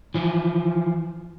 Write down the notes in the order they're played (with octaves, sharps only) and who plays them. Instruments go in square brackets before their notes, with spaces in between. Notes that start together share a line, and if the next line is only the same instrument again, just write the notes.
[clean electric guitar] E3 F3